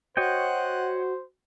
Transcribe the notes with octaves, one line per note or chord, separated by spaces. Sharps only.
F#4 C5 C#5 D#5 F#5 G5